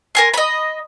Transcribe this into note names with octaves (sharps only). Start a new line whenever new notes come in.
A#4 G#5 C6
D#5 B5